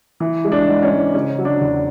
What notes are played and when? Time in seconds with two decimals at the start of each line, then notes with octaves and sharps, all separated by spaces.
0.20 E3
0.44 G#3
0.52 D4
0.67 G#2
0.83 C#4
0.91 G#2
1.14 C#3 C#4
1.38 F#3
1.45 D4
1.61 E2